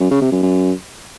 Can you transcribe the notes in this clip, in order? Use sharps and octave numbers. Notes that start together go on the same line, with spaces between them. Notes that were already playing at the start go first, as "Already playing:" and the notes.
F#2
C#3
C3
F#2
F#2